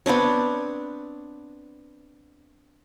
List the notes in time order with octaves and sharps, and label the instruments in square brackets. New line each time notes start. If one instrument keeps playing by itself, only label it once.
[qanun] B3 C4 D4 C#5